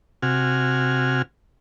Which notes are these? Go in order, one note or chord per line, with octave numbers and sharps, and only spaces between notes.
C3 F#4 G#5 F6